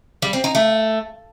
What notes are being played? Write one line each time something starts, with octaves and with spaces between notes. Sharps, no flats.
G3
C4
D#4
A3